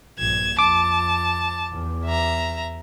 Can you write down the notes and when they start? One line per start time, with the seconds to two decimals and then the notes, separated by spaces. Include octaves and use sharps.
0.19 A#1 G2 G#6 E7
0.59 F2 A5 D6
1.72 E2
2.05 E5 A#5